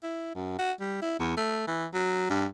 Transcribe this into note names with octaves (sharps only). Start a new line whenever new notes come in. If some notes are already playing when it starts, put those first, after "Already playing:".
E4
F#2
F#4
G3
E4
E2
A3
E3
F#3
G2